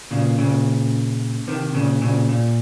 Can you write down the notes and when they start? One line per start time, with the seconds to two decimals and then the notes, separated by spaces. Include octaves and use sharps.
0.11 A#2 C#3
0.38 A#2 C#3
1.47 C3 D#3
1.75 A#2 C#3
2.01 A#2 C#3
2.29 A#2